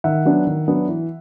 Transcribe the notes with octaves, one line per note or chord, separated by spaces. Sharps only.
D#3 E5 F#5
F#3 B3 D4
D#3
F#3 B3 D4
E3